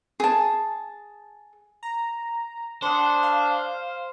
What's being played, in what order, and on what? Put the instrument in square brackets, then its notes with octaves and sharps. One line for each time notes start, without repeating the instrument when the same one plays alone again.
[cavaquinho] G#4 A5
[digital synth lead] A#5
[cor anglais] D4 [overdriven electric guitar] C5 [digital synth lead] F#5 [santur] C6 D#6
[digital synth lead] F5